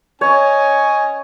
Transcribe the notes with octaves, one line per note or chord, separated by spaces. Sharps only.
C#4 C#5 D#5 G#5